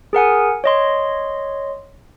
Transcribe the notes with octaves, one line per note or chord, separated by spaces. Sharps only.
G#4 A#4 F#5 G#5
C#5 D#5 C6